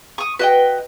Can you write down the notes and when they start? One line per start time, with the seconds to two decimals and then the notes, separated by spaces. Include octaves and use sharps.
0.18 C#6 D#6
0.39 F#4 B4 D#5 G5